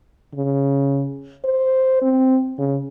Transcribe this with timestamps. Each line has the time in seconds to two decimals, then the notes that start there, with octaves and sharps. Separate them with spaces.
0.34 C#3
1.44 C5
2.02 C4
2.59 C#3